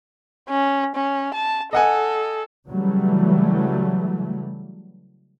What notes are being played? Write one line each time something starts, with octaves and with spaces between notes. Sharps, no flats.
C#4
C#4
A5
A4 D#5 F#5 G#5
C#3 E3 F#3 G3 A3